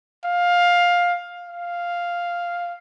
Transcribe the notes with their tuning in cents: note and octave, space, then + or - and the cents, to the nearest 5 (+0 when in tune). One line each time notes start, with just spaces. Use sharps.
F5 +15
F5 +0